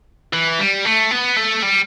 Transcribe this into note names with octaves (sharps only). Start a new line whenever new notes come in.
E3
G3
A3
B3
A3
G3